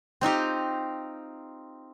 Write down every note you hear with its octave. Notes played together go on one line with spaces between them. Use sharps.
C4 D#4 F4 G4